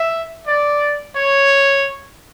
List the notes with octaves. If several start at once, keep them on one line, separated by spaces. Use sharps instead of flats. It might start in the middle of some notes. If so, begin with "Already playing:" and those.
Already playing: E5
D5
C#5